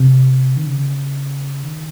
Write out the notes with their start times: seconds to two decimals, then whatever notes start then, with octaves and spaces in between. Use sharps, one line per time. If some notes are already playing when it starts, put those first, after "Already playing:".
Already playing: C3
0.57 D#3
0.66 C#3
1.63 D#3